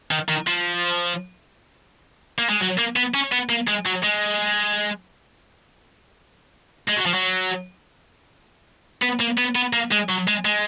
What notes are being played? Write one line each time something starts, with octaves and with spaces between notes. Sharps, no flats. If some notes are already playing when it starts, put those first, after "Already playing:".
D#3
D#3
F3
A#3
G#3
F#3
A#3
B3
C#4
B3
A#3
G#3
F#3
G#3
G#3
F#3
F3
F#3
B3
A#3
B3
B3
A#3
G#3
F#3
G#3
G#3